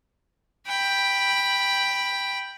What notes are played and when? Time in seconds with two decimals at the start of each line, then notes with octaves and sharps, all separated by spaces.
0.67 G5 B5